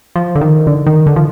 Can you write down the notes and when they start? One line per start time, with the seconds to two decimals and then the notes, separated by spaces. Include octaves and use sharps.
0.16 F3
0.35 D3
0.41 D#3
0.67 D3
0.86 D#3
1.07 D3
1.16 F3